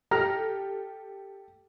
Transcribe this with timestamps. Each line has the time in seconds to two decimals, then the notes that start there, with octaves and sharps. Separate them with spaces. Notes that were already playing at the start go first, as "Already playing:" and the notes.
0.11 G4 A4 A#5 F6